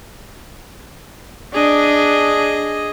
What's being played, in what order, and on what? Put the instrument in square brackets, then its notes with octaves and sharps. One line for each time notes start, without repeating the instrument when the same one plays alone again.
[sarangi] D4 [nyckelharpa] G#4 D#5